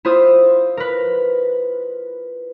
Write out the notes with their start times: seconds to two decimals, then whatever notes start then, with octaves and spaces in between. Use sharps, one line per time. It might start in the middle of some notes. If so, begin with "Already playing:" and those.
0.05 E4 F4 C5 D#6
0.77 A#4 B4